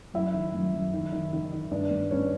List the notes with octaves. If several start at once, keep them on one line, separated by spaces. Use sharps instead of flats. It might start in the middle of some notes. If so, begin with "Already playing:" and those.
F#2 E4 E5
D#3
F#2
F#2
D#3
D#3
D#3
D#3
G2 D4 D5
G2
G2 C#4 C#5